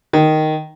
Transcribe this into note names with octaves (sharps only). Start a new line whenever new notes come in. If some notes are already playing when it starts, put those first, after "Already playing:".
D#3